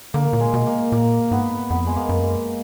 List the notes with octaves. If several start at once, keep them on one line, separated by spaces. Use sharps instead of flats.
D3 A#3
A#2
G#3
B2
A#3
A#2 A#3
G#2 B3
F2 B3
G#3
A#3
F#2
G#3